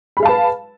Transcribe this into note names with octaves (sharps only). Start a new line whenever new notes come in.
G#4 B4 F5 A5 B5